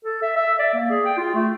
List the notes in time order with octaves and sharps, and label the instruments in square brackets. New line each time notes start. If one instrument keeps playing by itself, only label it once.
[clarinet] A4
E5
E5
D5
A#3
G#4
G5
F4
A3